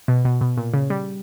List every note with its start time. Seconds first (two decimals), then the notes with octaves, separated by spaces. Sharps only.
0.08 B2
0.25 B2
0.41 B2
0.57 A#2
0.74 C#3
0.90 G3